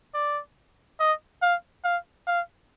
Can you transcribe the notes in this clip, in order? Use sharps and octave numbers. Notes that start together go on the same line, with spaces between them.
D5
D#5
F5
F5
F5